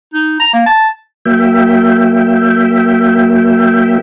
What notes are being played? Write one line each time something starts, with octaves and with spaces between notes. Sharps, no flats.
D#4
A#5
A#3
A5
F#3 A#3 E5 G5